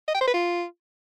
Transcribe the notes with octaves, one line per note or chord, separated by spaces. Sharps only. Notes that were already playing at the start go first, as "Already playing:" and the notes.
D#5
G5
C5
B4
F4